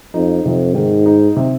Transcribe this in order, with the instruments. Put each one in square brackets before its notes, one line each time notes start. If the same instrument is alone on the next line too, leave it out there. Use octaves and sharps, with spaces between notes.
[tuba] F2 [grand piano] D#4
[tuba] F2 [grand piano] C3
[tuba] G#2 [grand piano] D#3
[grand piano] D#4
C3